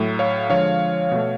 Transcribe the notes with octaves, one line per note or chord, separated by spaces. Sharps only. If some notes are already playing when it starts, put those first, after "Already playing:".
Already playing: A2 F#3 A3
C#5 F5
D3 F3 G#3 C#5 F5
B2 A3